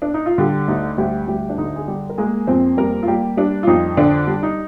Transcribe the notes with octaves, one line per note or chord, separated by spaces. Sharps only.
D4
D#4
F4
D3 G3 G4
D2 D#4
D2 G3 G4
D2 G3 G4
D4
D3 D#4
G#4
G3 G4
A#4
G#3 A#3 G#4
F2 C4 C5
G3 A#3 A#4
F4
G3 A#3 G4
G3 D4
F4
F2 D#4
D3 D4
G3
D#4